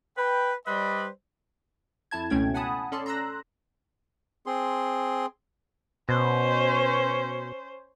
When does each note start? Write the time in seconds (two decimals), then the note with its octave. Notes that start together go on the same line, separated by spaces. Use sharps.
0.17 B4 G5
0.67 G3 B4 C5 D5 D#5 B5
2.11 F2 E4 A5 G#6
2.30 C#2 B2 A3 C#4 G5 G#6
2.54 F#5 G#5 A5 B5 D#6
2.92 C#4 A4 D5 A5 C6
3.06 A#5 C6 E6 F#6 A#6
4.46 C4 G#4 C6
6.09 B2 C#4 C5